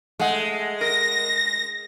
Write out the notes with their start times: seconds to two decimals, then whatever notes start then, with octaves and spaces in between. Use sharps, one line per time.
0.20 G#3 A3 F#5
0.81 A#4 A#6